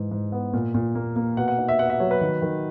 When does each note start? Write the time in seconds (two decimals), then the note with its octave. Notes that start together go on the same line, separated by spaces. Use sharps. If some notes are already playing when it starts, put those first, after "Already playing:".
Already playing: G#2 E3
0.11 G#2
0.32 B3
0.53 A#2
0.74 A#2
0.95 A#3
1.16 A#3
1.37 B2 F#5
1.48 F#5
1.58 D#4
1.69 E5
1.79 B3 F#5
1.90 E5
2.00 F#3 C#5
2.11 B4
2.21 D#3
2.42 D#3